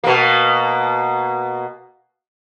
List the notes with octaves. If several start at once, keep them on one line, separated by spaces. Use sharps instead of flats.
B2 A#3